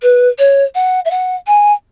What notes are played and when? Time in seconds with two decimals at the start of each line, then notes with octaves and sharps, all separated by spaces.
0.02 B4
0.39 C#5
0.75 F#5
1.05 E5
1.11 F#5
1.47 G#5